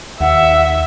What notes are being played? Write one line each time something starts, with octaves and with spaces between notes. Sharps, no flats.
D#2 E5 F#5